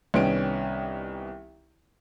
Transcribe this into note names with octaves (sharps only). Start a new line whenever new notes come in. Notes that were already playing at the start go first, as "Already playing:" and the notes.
C2 D#3 B3 C#4 G5 D7